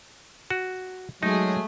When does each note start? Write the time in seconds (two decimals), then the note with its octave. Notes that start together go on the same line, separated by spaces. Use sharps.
0.50 F#4
1.23 F#3 G#3 A3 D#4 G#4